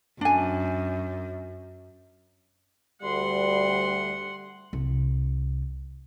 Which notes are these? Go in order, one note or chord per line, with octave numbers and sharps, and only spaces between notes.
F#2 D4 G#5
D2 G3 F#5 C6
C2